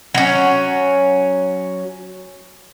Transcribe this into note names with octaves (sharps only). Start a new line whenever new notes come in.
F#3 C#4